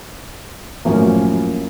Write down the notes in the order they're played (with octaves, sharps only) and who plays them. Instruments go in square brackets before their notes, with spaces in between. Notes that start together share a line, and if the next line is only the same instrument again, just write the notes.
[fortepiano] F#2 A2 F3 [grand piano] A#3 C#4